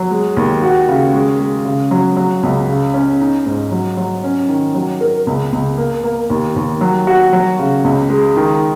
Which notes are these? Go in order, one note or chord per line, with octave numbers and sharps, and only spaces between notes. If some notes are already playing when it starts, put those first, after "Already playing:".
Already playing: F#3
G#3
D#2
F#4
C#3
G#3
G#3
C#3
F#3
F#3
C#2
C#3
C#4
D#4
G#2
F#3
F#3
C#4
D#3
F#3
A#4
C#2
C#2
A#3
A#3
D#2
D#2
F#3
F#4
F#3
C#3
C#2
G#3
D#3